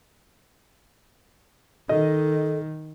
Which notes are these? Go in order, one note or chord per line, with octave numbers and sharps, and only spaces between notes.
D#3 A4 D#5